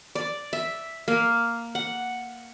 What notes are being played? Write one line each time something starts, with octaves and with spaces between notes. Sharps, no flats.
D5
E5
A#3
F#5